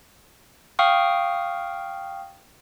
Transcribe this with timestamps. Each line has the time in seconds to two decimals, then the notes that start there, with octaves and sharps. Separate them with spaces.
0.79 F5 G5 C#6 D#6 F6